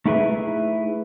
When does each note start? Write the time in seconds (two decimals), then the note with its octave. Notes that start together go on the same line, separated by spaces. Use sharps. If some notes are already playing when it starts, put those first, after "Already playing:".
0.06 A3 D#4 E4 G#4 B4 E5